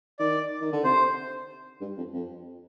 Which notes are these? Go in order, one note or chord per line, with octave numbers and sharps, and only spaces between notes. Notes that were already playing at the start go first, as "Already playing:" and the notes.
D#3 D5
D#3
D3
C3 C5
G2
F2
F2